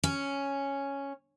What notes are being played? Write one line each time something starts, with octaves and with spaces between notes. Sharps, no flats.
C#4